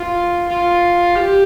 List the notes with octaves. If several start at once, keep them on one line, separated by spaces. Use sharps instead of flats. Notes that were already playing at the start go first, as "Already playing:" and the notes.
Already playing: F4
F4
G4